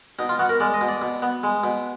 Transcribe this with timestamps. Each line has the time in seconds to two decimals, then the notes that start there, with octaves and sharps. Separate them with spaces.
0.19 B2 D#4
0.29 F4
0.39 B3 F#4
0.49 A#4
0.60 G#3 D5
0.74 D#5
0.81 B2
0.88 D5
1.02 B2
1.22 B3
1.43 G#3
1.64 B2